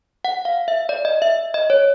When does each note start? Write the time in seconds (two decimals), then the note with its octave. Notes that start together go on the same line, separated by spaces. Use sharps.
0.25 F#5
0.45 F5
0.68 E5
0.89 D5
1.05 D#5
1.22 E5
1.54 D#5
1.70 C#5